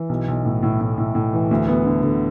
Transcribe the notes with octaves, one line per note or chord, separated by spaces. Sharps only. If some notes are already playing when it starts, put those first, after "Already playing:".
Already playing: E3
B1
B1
A2
A2
A2
A2
A2
E3
D2
B3
D3
D3